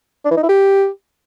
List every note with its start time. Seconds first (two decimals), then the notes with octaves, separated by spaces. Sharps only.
0.25 D4
0.31 E3
0.37 D#4
0.43 E4
0.49 G4